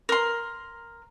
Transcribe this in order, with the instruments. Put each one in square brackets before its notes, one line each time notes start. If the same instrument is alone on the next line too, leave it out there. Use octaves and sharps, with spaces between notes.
[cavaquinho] A#4 C6